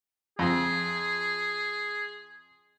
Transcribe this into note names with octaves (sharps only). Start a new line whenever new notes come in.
F2 G#4